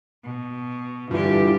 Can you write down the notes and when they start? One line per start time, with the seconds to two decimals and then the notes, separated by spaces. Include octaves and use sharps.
0.24 B2
1.11 G2 D3 E3 F4 G4